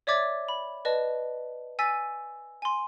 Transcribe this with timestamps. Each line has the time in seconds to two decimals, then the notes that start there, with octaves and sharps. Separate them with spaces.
0.07 C#5 D5 E5 D6 G#6 A6
0.48 B5
0.85 B4 D5 D#5 A5
1.79 G#5 E6 A6 B6 D#7
2.62 G#5 C6